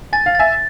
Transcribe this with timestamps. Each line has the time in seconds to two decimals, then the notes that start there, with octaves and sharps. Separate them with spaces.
0.13 G#5 A6
0.26 F5
0.35 E5 G#5 A6